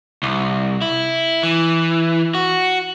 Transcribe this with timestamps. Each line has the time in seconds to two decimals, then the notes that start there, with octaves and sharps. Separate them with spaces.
0.23 C2
0.82 E4
1.43 E3
2.35 F#4